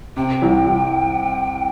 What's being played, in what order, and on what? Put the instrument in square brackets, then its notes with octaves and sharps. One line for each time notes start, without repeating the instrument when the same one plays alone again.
[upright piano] C3 [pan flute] G5
[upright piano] C2
C2